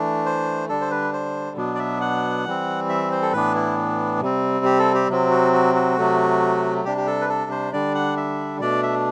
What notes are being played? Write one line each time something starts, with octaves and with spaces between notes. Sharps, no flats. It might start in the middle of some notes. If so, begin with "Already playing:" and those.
Already playing: E3 A3 D4
C5
D3 G3 D4 A4
C5
B4
C5
B2 F#3 B3 D4
D5
E5
F#5
E3 G3 C4
E5
C5
A4
A2 E3 B3 D4 B4
E4
C3 G3 C4
G4
A4
G4
C3 F#3 C4
F#4
F#4
F#4
C3 F#3 A3
C3 G3 D4 G4
G4
A4
B4
A4
C5
D3 G3 D4 D5
F#5
E5
B2 A3 D4 D5
E5